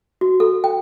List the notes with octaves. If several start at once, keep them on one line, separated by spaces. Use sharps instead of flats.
F#4
A4
G5